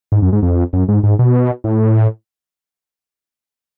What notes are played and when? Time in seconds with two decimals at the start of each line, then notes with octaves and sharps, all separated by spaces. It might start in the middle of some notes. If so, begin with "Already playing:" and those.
0.12 G#2
0.22 F#2
0.33 G#2
0.42 F2
0.73 F#2
0.88 G#2
1.03 G#2
1.19 B2
1.64 A2